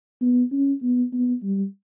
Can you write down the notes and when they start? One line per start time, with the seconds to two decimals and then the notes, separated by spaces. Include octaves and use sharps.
0.22 B3
0.52 C#4
0.83 B3
1.13 B3
1.43 G3